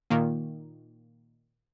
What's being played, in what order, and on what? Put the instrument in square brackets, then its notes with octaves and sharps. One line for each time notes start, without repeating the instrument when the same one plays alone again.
[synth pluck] A#2 D#3 A#3